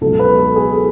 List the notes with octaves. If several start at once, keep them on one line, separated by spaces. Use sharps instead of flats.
C#2 B2 F#3 A4
B4
A4
G#4